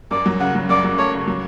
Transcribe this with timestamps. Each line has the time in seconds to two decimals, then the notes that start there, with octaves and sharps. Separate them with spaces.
0.11 F#2 D5
0.26 F#3
0.40 C#3 F#5
0.55 F#3
0.69 F#2 D5
0.84 F#3
0.98 A3 C#5
1.13 C#3
1.27 F#3